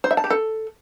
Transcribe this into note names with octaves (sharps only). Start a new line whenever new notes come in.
C5
E5
A5
G4
A4